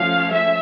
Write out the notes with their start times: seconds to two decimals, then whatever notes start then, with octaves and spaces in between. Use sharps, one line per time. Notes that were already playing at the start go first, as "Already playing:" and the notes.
Already playing: F3 A3 C#4 F5
0.31 E5